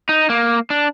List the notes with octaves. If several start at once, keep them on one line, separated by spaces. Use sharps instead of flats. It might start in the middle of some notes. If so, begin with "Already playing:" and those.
D#4
A#3
D4